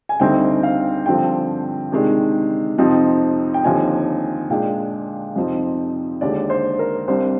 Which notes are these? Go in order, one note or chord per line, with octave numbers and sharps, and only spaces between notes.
G#5
D2 D3 G3 C4 D#4 G5
F5
G2 D3 F3 C4 G5
C3 D#3 G#3 D4
F2 C3 F3 C4 D#4
G5
D#2 D3 F3 C4 D#4 G#5
A#2 G#3 D4 G5
F2 C3 F3 C4 D#4
D#2 D3 G#3 D5
C5
A#4
C2 C3 G3 D4 C5